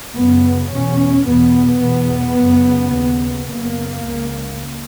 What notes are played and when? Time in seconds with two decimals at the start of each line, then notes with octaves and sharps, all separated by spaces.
0.15 F#2 C#3 B3
0.70 E2 B2 C#4
1.25 E2 B2 B3
1.81 E2 B2
2.37 F#2 C#3
2.92 D#2 C#3
3.47 F#2 C#3 A#3
4.03 C#2 C#3